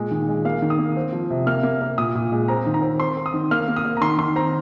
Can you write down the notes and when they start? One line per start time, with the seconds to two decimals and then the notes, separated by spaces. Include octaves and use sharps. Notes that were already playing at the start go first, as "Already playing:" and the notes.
Already playing: A#2 G#3
0.11 D#3
0.29 G#3
0.45 A#3 F5
0.62 D#3
0.70 D#6
0.78 A#3
0.97 C4
1.13 F3
1.30 C3
1.46 A#3 F6
1.63 A#3
1.81 A#3
1.98 A#2 D#6
2.15 A#2
2.32 G#3
2.48 C4 A#5
2.66 D#3
2.74 A#5
2.82 C4
3.00 C4 C6
3.17 C4
3.26 D#6
3.34 D#3
3.51 A#3 F6
3.68 A#3
3.76 D#6
3.85 A#3
3.97 A#5
4.01 D#3 C6
4.18 D#3 C6
4.36 C4 A#5